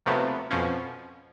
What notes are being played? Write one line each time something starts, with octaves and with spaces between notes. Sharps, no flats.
D#2 C3 F3 F#3 A3 B3
F2 B2 F3 C#4